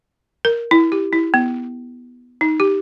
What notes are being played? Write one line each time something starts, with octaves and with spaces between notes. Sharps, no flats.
A#4
E4
G4
E4
B3
D#4
G4